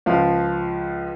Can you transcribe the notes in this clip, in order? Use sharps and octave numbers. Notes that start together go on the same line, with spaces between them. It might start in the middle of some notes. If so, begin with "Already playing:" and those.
C#2 F3 F5